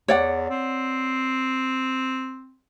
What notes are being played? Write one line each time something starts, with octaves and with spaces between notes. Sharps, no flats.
E2 C#5 D5 F#5
C4